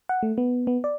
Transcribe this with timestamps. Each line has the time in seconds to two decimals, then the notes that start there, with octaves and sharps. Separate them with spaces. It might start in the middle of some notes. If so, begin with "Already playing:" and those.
0.09 F#5
0.23 A3
0.38 B3
0.67 B3
0.84 D5